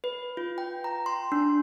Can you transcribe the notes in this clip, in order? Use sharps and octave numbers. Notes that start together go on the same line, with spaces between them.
B4
F4
G5
A#5
C6
D4